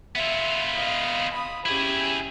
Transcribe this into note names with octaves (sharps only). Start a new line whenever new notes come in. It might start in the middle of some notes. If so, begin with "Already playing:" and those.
B3 F4 E5
D#5 F5
B5 D#6
C#4 E4 G4 G#4